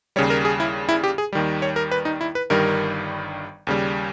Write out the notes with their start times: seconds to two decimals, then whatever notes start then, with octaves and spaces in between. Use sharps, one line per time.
0.16 D#2 C#3 G3 C#5
0.30 A#4
0.45 G#4
0.60 E4
0.89 E4
1.04 G4
1.18 G#4
1.32 D#2 D#3 G3
1.62 C#5
1.76 A#4
1.92 B4
2.05 D#4
2.21 E4
2.35 B4
2.50 G1 G2 D#3 G3 A#4
3.67 D#2 C#3 G3